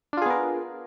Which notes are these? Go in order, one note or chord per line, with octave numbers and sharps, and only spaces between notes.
B3 D4 F4 G#4 A#4